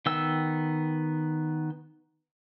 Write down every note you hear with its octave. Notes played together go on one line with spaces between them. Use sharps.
D#3 B3 G5 E6